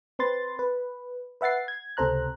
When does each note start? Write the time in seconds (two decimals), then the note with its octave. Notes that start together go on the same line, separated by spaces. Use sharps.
0.19 C4 B4 C6 A6
0.59 B4
1.41 B4 E5 F#5 A6 C7
1.68 G#6
1.97 C#2 C3 A4 C5 A#5 F#6